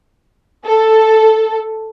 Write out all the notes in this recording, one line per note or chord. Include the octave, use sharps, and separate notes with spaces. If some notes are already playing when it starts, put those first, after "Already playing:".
A4